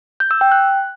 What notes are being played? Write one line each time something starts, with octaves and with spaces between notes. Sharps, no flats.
G6
E6
G5
F#6